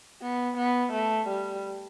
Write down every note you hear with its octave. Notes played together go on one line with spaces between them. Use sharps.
B3
B3
A3
G3